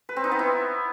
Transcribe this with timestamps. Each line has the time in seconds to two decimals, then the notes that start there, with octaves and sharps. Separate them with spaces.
0.09 B4
0.16 C4
0.24 D#4
0.31 B3
0.39 E4